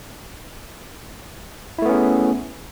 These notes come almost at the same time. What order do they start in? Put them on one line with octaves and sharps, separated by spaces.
E4 A3 B3 C#4 G#4